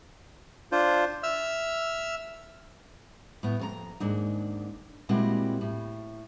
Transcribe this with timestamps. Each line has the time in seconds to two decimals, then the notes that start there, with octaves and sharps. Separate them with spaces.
0.72 D4 F4 C5
1.23 E5 E6 F6
3.43 A2 B3
3.59 F2 A#4 A#5
4.00 D#2 G#2 D4 D#4
5.09 A#2 G3 G#3 C4 E4 F#4
5.61 A2